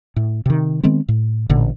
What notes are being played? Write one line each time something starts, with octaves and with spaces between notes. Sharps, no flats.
A2
C3 D#3
D#3 G#3 B3 C4
A2
A1 A#2 D3